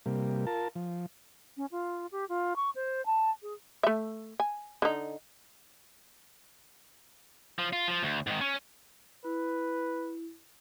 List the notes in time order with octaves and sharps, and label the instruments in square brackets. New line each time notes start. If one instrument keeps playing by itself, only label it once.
[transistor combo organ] C3 G3 A#3
F4 A#4 A5
F3
[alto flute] C#4
F4
G4
F4
C#6
C5
A5
G#4
[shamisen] A3 E5
G#5
D3 D#4
[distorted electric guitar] F3
F4
F3
D2
G#2 D#3
C#4
[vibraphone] E4 [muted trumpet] B4